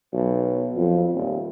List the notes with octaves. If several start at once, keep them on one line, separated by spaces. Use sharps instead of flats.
B1
F2
D#1